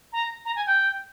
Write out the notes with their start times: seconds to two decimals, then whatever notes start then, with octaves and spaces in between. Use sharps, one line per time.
0.13 A#5
0.45 A#5
0.56 G#5
0.66 G5